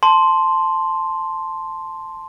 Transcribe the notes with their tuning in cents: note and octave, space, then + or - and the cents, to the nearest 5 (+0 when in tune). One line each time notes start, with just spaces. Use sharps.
A5 +0 C6 +0